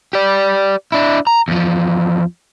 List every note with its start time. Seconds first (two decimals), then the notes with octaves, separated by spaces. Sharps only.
0.13 G4 D5
0.92 D4 E4
1.27 A#5
1.48 E2 F3